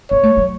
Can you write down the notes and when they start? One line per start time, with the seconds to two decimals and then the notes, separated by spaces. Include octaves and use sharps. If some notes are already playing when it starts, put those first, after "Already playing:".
0.11 B3 C#5
0.23 A3
0.37 F#3